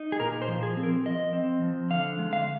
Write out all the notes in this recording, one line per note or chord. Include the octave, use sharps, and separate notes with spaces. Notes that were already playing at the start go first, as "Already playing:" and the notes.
Already playing: D#4
G#4
A#2 A#4
C5
F3
G#4
C4
A#4
F3 D#5
C4
F3
D3 F5
G#3
F5